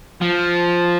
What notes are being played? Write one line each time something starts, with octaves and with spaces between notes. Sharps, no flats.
F3